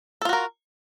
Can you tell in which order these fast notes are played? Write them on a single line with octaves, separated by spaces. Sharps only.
A4 F4 F#4 A#4